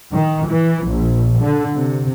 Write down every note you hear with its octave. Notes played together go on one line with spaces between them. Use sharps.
D#3
E3
A#1
D3
C3